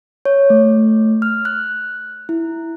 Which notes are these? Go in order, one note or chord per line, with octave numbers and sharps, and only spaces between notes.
C#5
A3
F6
F#6
E4